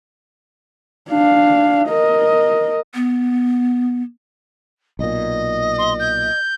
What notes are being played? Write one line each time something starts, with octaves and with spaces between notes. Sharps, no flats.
D4 F5
A#4 D#5
B3
B1 A#2 D#5
C6
G6